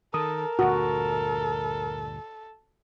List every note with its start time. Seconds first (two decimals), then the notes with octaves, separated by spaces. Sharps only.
0.14 D#3 A4 A#4 D#6
0.59 D2 G2 A#2 F#4 A4